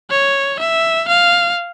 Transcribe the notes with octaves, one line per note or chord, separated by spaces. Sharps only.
C#5
E5
F5